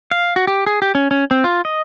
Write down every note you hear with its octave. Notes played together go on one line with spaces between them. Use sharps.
F5
F#4
G4
G#4
G4
C#4
C#4
C4
F4
D#5